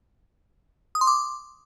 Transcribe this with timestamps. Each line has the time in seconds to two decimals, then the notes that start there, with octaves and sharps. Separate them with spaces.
0.95 D#6
1.01 C6
1.07 D6